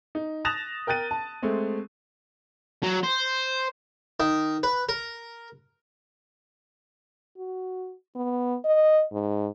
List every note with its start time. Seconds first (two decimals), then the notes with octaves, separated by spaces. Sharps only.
0.15 D#4
0.45 D#6 F#6 A6 A#6 E7 F7
0.87 A#4 G5 F#6 A6 D#7
1.11 A5
1.43 G#3 A3 C4
2.83 F#3
3.03 C5
4.20 D#3
4.63 B4
4.89 A#4
7.37 F#4
8.15 B3
8.65 D#5
9.12 G#2